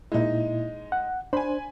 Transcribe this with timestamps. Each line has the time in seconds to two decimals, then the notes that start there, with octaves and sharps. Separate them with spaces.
0.12 A#2 G#3 D#4 E4
0.92 F#5
1.33 D4 C5 G#5 B5